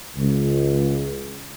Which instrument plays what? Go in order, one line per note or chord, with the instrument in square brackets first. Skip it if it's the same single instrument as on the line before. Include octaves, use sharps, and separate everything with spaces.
[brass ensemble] C#2